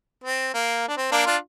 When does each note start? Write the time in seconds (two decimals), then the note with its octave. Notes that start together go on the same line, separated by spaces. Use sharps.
0.24 C4
0.54 A#3
0.89 D4
0.97 C4
1.12 A#3 D4
1.26 D4 F4